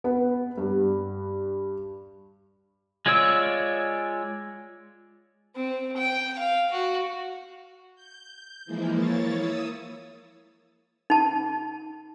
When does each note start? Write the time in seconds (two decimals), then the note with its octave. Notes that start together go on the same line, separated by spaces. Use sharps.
0.04 B3
0.58 G2
3.06 G#3 F4 C#5 D5 E6
5.56 C4
5.97 G5
6.38 F5
6.72 F#4
7.95 G6
8.65 E3 F3 G#3 A#3 E4
8.95 A#3 E4 C#5 A6
9.35 D#6 E6
11.10 D#4 A5